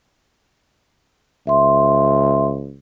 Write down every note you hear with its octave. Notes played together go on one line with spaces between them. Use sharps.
C#2 E5 C6